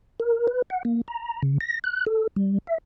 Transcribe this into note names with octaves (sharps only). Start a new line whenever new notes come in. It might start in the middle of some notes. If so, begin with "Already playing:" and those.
A#4
B4
F#5
A#3
A#5
C#3
A#6
F#6
A4
G3
E5